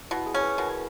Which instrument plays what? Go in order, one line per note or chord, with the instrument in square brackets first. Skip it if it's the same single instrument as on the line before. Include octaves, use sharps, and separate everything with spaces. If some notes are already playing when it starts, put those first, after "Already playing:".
[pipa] B2 [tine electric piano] E4
[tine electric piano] G#4
[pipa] C#4
[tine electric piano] B4
[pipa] B2 [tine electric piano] A#4